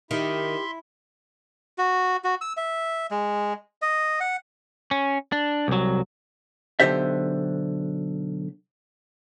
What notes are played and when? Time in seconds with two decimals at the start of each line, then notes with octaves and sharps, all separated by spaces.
0.11 D#3 E4 G4 E5 C6
1.78 F#4
2.24 F#4
2.41 E6
2.57 E5
3.11 G#3
3.82 D#5
4.20 F#5
4.91 C#4
5.32 D4
5.68 C2 F#3
6.80 B1 A#2 D3 G4 C5 E5